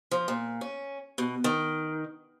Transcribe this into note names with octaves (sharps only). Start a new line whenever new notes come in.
F3
A#2
C#4
B2
D#3